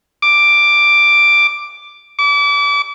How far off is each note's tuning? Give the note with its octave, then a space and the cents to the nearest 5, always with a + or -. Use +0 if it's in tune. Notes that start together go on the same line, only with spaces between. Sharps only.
D6 +5
D6 -35